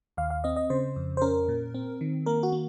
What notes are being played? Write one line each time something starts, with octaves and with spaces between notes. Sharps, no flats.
D#2 F5
F5
C4 D#5
D#5
C#3 C5
F2
C5
C#4 A#4
A#2
C4
D#3
A#3 A#4
F#4
A#3